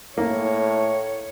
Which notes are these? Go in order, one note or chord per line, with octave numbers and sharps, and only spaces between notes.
A2 A#3 C#5